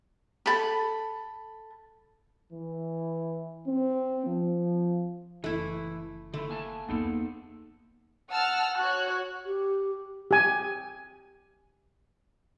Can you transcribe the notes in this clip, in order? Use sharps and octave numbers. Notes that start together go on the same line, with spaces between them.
A4 B5
E3
C4
F3
F#1 E3 A3 E4
D3 A3 E4
A#3 G#5 A5
E2 A#3 B3 D#4 A4
F#5 A5 E6 F6
F#4 C#5 F#6
G4
G4 G#5